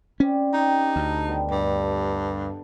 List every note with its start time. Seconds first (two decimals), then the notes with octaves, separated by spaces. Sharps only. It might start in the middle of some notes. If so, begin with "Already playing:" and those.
0.20 C4 C#4 D5
0.54 D#4 G4
0.96 D2 A4
1.28 D#3 G3 B3
1.51 G2 D3